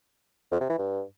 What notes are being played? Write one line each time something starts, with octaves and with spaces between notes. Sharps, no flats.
F2
C3
E3
G2